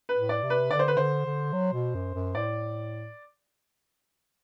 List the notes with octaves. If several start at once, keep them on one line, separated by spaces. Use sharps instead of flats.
B4
A2
D5
C3
B4
D3 D5
C5
B4
D3 C5
D3
F#3
B2
F#2
F#2
A2 D5